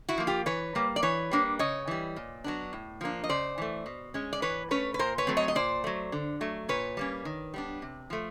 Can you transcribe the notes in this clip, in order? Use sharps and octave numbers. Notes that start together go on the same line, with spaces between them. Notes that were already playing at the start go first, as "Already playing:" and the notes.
E4 F#4
F3 A#3
F4 G4
E3 B4 C#5
G3 A#3
D5
E3 B4 C#5
G3 A#3 D4
C#3 C#5 D#5
E3 G3
A#2
F#3 B3 D4
A2
F3 A#3 D4
D#5
C#3 C5 D5
E3 A3
B2
G#3 C#4
D5
E3 B4 C#5
A3 C#4 B4 C#5
B4
A#2 A#4 C5
B4 C#5
F#3 A3 C4
C#5 D#5
D#5
A#2 C5 D5
F#3 A3
D3
F#3 A3
A#2 B4 C#5
G3 A#3 C#4
D#3
G3 B3 D4
C3
F3 A3